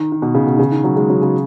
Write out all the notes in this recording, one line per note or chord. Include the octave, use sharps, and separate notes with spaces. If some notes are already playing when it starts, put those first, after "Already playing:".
Already playing: D#3
D#3
B2
C#3
B2
D#3
C#3
D#3
F#3
G#3
F#3
C#3